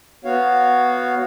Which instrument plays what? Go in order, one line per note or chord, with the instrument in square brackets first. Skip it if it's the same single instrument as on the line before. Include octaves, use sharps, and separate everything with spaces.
[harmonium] B3 F#4 C#5 F5